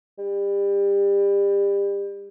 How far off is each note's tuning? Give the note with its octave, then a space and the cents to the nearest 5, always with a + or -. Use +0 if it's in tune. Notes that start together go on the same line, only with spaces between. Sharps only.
G3 +30